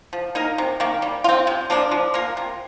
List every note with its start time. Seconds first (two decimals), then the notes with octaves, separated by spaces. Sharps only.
0.13 F3
0.35 A#3 D#4 A#4
0.58 C3
0.80 D#3 A#3
1.02 G3
1.24 F4
1.29 C4
1.47 C3
1.70 F3 A#3 D4
1.91 F3
2.14 A#3 F4 A#4
2.37 C3